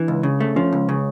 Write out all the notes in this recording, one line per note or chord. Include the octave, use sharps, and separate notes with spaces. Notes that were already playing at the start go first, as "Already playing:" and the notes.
Already playing: E3 D4
C#2
C#3
A3
F3 C#4
C#2
C#3